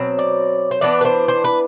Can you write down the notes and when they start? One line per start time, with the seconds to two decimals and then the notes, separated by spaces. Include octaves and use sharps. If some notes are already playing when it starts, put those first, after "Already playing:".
Already playing: B2 F#3 C4
0.19 D5
0.71 C5
0.81 E3 B3 D4 D5
1.01 B4
1.05 C5
1.28 C5
1.44 B4